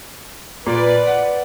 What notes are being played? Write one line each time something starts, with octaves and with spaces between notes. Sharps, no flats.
A#2 B4 D5
F#5